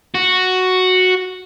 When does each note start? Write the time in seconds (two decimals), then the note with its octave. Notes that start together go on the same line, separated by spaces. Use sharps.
0.15 F#4